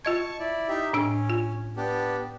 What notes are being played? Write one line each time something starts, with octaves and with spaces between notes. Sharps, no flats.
F4 D#5 A5 C#6 G#6
E4 D5
D#4 G4 E5
A2 C#4 D4 E6
F4
B3 D4 G4